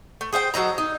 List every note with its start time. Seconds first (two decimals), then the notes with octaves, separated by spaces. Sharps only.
0.21 A3
0.33 G#4 C5 E5 G5
0.54 F#3 A4 D#5 A#5
0.78 D#4